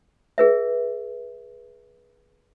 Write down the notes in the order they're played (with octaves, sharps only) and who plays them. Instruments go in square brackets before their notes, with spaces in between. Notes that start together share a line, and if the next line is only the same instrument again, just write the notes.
[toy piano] G#4 B4 E5